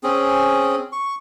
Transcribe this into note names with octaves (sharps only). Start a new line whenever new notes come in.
C4 C#4 G#4
C#6